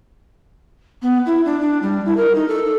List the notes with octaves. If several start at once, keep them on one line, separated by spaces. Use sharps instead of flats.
B3
E4
D4
D4
G3
E4
A#4
D#4
A4